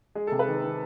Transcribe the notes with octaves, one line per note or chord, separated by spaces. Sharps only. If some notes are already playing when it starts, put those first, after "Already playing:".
G#3 G#4
C3 A4
B4
D#3
D#3